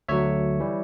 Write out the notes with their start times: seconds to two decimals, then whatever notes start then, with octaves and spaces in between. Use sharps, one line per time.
0.08 D2 D3 F#3 C#5 E5
0.60 E3 G3